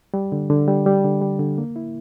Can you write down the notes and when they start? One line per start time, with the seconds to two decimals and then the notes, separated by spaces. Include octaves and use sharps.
0.14 G3
0.32 D3
0.50 D3
0.68 G3
0.86 G3
1.04 D3
1.21 G3
1.39 D3
1.58 A#3
1.76 E4